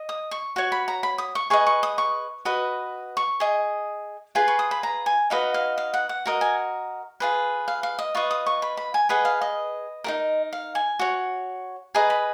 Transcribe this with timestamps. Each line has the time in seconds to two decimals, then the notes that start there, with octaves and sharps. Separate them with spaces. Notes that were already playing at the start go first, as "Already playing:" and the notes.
Already playing: D#5
0.09 D#6
0.31 C#6
0.56 F#4 C#5 C#6
0.72 B5
0.88 A#5
1.03 B5
1.18 D#6
1.35 C#6
1.50 G#4 B4 D#5 C#6
1.67 C#6
1.83 D#6
1.98 C#6
2.45 F#4 B4 D#5
3.17 C#6
3.40 G#4 D#5
4.35 F4 G#4 B4 B5
4.48 C#6
4.59 D#6
4.71 B5
4.83 A#5
5.06 G#5
5.30 D#4 F#4 B4 D#5 F5
5.54 F5
5.78 F5
5.94 F#5
6.09 F#5
6.26 F#4 A#4 D#5
6.41 G#5
7.20 F4 G#4 B4
7.68 F5
7.83 F5
7.99 D#5
8.15 F4 B4 D#5 C#6
8.31 D#6
8.46 C#6
8.62 B5
8.77 B5
8.94 G#5
9.09 G#4 B4 D#5 F#5
9.25 F5
9.42 D#5
10.04 D#4 F#4 A#4
10.53 F5
10.75 G#5
10.99 F#4 C#5
11.95 G#4 B4 D#5 A#5
12.10 B5